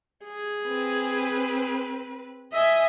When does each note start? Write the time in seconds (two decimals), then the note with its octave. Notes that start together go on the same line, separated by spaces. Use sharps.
0.25 G#4
0.67 C4 B4
2.53 D#5 E5 G#5